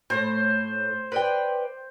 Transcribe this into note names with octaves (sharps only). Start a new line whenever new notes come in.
A2 C5
B4 D5 G5